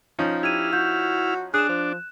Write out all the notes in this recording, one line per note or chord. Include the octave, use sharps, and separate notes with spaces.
F3 C#4 D#4
E4 G4 F6 G#6 D#7
F#4 G6
D4 G#4 F#6 E7
F3